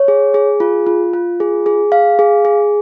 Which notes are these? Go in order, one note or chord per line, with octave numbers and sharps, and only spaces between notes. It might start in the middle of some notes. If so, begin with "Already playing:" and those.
Already playing: C#5
G#4
G#4
F4
F4
F4
G#4
G#4
F5
G#4
G#4